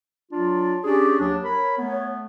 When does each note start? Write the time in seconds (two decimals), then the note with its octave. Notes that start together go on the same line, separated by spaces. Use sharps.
0.32 F#3 D4 F4
0.84 C#4 D4 G4 G#4
1.19 D#2 F#3 D4
1.43 A#4 C#5 B5
1.78 A3 B3